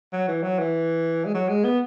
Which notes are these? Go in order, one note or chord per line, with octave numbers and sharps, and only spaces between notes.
F#3
E3
F#3
E3
G#3
F#3
G#3
B3